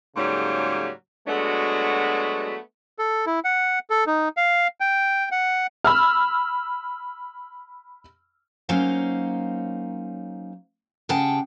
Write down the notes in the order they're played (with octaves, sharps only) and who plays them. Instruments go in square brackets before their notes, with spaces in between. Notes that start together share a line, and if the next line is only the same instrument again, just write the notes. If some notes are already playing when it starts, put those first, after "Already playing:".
[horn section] G#2 C#3 F#3 G3 A#3
F#3 G#3 A3 B3 D4 F#4
[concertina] A4
E4
F#5
A4
D#4
F5
G5
F#5
[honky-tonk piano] B5 E6 F6
[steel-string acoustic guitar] F#3 A#3 C#4 D#4 C5 F5
C#3 G4 G#4 F#5 G5 A5